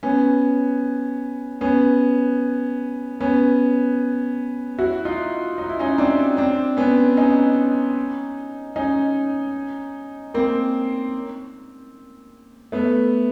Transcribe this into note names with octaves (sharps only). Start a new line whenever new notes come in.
B3 C#4
B3 C#4
B3 C#4
E4 F#4
D#4 F4
D#4
E4
C#4 D#4
C4 D4
C4 D4
B3 C#4
C#4 D#4
C#4 D#4
A#3 C4
A3 B3